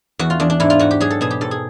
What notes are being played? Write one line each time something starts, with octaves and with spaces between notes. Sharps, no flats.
E2 F#4
F4
E2 D4
D4
G#2 E4
F4
G#2 F#4
G4
F#3 G#4
A4
B2 G#4
G4
G#2 A4
G#4